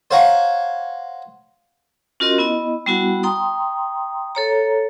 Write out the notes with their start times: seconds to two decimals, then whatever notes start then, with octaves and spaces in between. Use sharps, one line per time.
0.11 C5 C#5 F5 F#5 A#5 C#6
2.20 C#4 F4 F#4 A#4 D#5 C6
2.38 B3 E4 D#5
2.86 G3 B3 E4 F#4 F#5
3.23 G5 A#5 C6 D#6
4.35 A4 C#5 A#5